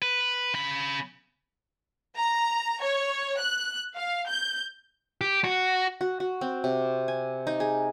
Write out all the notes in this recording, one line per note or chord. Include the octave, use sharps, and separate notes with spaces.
B4
C#3 B5
A#5
C#5
F#6
F5
G6
G4
F#4
F#4
F#4
C4
C3
G#5
D#4
G#4